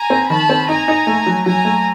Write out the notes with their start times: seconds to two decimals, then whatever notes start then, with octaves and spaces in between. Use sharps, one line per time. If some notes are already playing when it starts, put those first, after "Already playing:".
Already playing: G#5 A#5
0.10 C4
0.29 D#3 A5 B5
0.49 C4
0.68 D#4 G#5 A#5
0.88 D#4
1.07 A3
1.26 F#3
1.45 F#3 G#5 A#5
1.65 A3